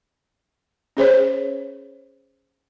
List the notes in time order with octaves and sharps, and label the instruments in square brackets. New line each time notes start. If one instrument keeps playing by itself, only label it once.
[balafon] C#4 G#4 C5 C#5